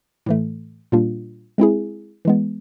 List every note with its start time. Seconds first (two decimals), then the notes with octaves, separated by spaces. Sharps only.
0.26 A2 E3 A3
0.92 A#2 G3 A#3 D4 F4
1.58 G#3 C4 E4 G#4
2.25 E3 G#3 B3